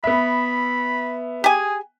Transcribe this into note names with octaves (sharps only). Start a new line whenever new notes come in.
B3 E5 B5
G4 G#4 G#5